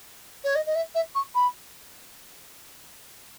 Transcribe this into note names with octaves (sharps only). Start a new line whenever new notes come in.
C#5
D#5
D#5
E5
E5
C#6
B5